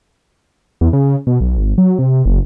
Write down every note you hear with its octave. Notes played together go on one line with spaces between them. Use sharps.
E2
C#3
B2
B1
G#1
F#3
C3
F#1